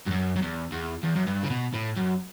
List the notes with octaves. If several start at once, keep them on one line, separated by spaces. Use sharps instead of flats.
G2
F#2
F#2
E2
E2
E2
F#2
G2
C#3
B2
A2
F#2